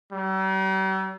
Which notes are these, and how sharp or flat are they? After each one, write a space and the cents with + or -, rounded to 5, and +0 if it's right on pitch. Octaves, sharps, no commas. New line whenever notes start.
G3 -45